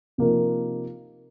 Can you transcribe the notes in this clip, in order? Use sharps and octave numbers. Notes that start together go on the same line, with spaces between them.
C3 F3 A#3 D#4 A#4